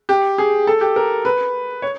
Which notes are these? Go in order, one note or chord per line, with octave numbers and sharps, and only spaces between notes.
G4
G#4
A4
G4
A#4
B4
C#5